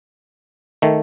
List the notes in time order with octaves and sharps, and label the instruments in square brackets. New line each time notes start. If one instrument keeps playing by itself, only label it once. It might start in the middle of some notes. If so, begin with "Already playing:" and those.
[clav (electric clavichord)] D#3 A3